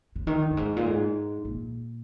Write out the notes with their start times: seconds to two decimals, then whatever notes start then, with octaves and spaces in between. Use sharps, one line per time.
0.16 C#3
0.27 D#3
0.51 G2
0.57 G#2
0.76 A#2
0.86 G#2
1.45 A#2